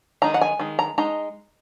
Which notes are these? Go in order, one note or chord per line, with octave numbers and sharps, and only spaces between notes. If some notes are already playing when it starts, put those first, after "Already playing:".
D#3 G#3 D#4 A#5
F#5
G#5
D#3 G#3
A#5
G#3 D#4 A#5